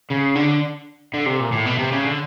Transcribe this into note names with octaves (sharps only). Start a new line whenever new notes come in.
C#3
D3
D3
C3
A#2
A2
B2
C3
C#3
D3